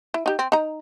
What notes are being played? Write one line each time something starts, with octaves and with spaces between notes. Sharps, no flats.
E4
D#4 G4
C4
D#4 A#5